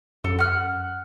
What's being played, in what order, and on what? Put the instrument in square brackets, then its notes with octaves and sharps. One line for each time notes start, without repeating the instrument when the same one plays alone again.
[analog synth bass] F#2 [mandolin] A4
[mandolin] F#5 F6